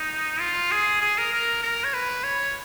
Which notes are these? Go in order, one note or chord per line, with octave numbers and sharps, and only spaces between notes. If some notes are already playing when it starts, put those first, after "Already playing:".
Already playing: D#4
F4
G#4
G#4
A#4
A#4
A#4
C#5
B4
C#5